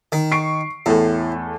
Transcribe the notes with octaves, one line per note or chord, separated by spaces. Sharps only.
D#3
C#6 C7 D7
E2 A2 A3 A4